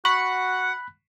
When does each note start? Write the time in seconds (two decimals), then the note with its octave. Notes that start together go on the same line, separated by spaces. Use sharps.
0.05 F#4 F#5 B5 C#6 F#6 B6